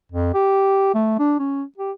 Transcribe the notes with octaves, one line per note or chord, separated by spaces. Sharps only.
F2
G4
A3
D4
C#4
G4